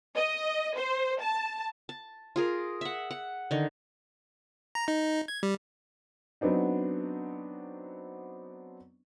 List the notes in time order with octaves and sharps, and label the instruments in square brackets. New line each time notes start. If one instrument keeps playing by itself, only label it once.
[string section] D#5
C5
A5
[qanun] A5
F4 G#4 A#4
E5 F#5
F#5
D3 D#3
[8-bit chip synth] A#5
D#4
G#6
G3
[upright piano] F#3 B3 C4 D4 D#4